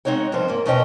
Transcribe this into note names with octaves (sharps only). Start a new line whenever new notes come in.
G#3 C4 D#4 C#5 F#5
G2 F3 C5
G#2 A#3
E2 B2 C#4 C5 D#5 G5